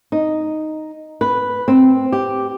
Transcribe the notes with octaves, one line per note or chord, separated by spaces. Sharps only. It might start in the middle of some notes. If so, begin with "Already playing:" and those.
D#4
B4
C4
G4